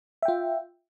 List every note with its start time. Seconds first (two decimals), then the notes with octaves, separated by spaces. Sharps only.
0.22 E5
0.25 G5
0.28 F4